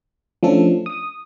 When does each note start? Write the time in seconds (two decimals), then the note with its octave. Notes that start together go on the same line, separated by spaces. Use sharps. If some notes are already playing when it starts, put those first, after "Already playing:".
0.43 F3 A3 C#4 D4 A4
0.86 D#6